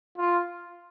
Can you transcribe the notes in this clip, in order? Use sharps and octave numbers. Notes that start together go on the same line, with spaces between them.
F4